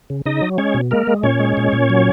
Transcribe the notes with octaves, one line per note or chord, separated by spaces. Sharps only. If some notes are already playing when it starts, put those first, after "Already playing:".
C#3
C#3 D#4 D#5
F#3
G#3 C#4 C#5
B2
G#3 A#3 A#4
G#3
A#2 C#4 C#5
G#3
A#2
A#2
F#3